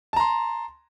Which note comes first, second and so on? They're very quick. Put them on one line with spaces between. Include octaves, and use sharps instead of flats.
A5 A#5 C6